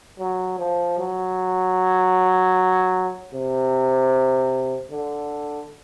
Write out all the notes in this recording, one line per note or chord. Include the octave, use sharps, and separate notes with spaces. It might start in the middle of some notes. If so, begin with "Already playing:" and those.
F#3
F3
F#3
C3
D3